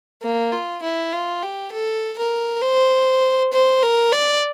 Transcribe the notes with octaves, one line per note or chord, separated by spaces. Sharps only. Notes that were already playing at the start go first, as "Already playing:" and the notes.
A#3
F4
E4
F4
G4
A4
A#4
C5
C5
A#4
D5